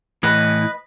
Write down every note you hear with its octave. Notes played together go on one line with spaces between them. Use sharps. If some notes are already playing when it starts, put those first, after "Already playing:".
A2 E3 B4 D#5